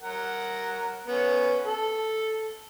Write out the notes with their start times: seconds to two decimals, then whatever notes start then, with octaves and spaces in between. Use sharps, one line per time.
0.02 A#4 F#5
1.07 B3 C#4
1.66 A4